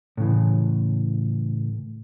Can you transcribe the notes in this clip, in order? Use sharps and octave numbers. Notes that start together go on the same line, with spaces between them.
A2 C#3 E3